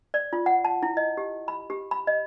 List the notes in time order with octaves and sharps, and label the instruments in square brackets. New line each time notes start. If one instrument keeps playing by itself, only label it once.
[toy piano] D5
F4
F#5
A5
E4
D#5
G4
B5
G4
B5
D#5